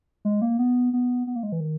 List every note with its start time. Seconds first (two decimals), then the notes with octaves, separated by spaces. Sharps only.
0.25 G#3
0.42 A#3
0.59 B3
0.93 B3
1.27 B3
1.36 A#3
1.43 G#3
1.52 E3
1.60 D#3